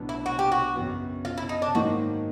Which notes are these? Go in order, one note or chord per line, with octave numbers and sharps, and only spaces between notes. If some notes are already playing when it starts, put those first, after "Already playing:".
Already playing: B1 A2 F#3 B3 D4
E4
F#4
G4
F#4
F#2 C#3 F#3 B3
F4
E4
D#4
D4
G#2 D#3 F#3 A#3 D#4 F#4